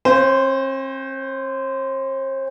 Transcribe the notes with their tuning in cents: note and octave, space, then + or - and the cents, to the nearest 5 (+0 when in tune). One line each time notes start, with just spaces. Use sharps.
C4 +45 C5 -20 F5 +0